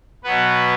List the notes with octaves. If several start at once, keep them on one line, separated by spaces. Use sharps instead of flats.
B2 F#3 B3 B4